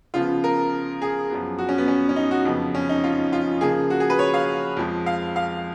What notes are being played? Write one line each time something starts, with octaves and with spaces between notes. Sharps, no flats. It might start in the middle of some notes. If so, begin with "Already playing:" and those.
C#3 F3 B3 F4
A#4
G#4
F#2 F3 B3
F#4
C#4
B3
C#4
C#4
D#4
F#4
F2 C#3 F3 B3
C#4
D#4
F4
F4
C#3 F3 A#3 G#4
F#4
G#4
B4
C#5
F5
F2 F3 G#3
F5
F5